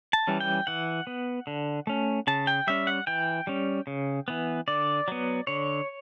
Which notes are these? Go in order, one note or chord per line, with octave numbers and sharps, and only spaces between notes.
A5
E3 G3 C#4
G5
E3 F#5
B3
D3
A3 C#4
C#3 A5
G5
G3 C#4 E5
F#5
E3 G5
G3 C#4
C#3
E3 B3
D3 D5
F#3 B3
D3 C#5